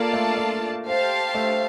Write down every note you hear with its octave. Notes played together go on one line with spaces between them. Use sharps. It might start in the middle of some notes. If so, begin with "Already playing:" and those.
Already playing: A#3 F4 A4 D5 F5 A5
A3
A3
G4 C5 F5 A5
A3